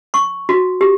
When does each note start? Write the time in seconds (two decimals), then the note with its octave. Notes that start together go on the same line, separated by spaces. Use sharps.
0.14 C#6
0.49 F#4
0.81 G4